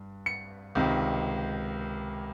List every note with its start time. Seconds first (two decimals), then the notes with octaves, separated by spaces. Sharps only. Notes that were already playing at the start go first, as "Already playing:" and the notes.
Already playing: G2
0.26 C#7
0.75 C#2 C3 D#3